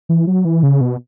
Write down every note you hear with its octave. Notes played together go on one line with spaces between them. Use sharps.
E3
F#3
E3
C#3
B2